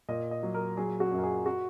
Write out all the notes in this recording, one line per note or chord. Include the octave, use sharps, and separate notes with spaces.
A#2 D#5
D#5
F#3
A#4
F#3 G#4
F#4
F#2
A#4
G#4
F#4